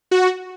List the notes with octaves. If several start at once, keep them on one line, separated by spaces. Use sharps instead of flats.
F#4